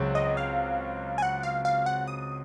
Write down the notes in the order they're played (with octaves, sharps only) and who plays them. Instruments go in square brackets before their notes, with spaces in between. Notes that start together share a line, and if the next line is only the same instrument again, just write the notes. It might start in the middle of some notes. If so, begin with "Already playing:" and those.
Already playing: [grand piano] C#2 C#3 F#3 C4
[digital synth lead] D#5
F5
G#5
F#5
F5
F5
F#5
D#6